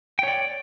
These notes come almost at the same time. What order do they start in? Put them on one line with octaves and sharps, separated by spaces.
G5 C#5 D5